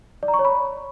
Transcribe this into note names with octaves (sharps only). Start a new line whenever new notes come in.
D5
A#5
C#6
C#5
B5